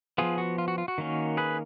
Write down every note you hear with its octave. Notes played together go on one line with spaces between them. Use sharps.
F3 B3 F4 G#4
F#4
F4
F#4
F4
F#4
D#3 A#3 C#4
G#4 B4